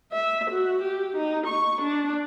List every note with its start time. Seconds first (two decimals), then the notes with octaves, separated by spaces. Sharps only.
0.12 E5
0.50 F#4
0.82 G4
1.17 D#4
1.46 C#6
1.81 D4